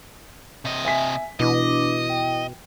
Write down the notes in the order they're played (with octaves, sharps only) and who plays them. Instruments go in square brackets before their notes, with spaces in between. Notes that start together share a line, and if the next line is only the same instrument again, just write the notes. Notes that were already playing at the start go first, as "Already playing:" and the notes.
[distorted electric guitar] C3 D#5
[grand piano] E5 G#5 B6
[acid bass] B2 [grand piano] E3 [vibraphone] D4 D6 [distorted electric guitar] D#5
[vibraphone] G5